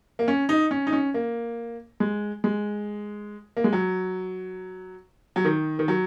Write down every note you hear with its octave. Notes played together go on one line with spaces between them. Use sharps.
A#3
C#4
D#4
C#4
D#4
C#4
A#3
G#3
G#3
A#3
G#3
F#3
F#3
D#3
D#3
F#3